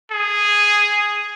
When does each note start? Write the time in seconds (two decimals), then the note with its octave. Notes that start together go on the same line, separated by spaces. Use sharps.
0.11 G#4